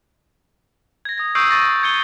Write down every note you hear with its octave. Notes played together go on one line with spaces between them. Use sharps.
G#6 A#6
D#6 A#6
C#6 D#6 E6 G6 C7 D7
C#6 A6 A#6
C#6 G#6 C#7 D#7 G7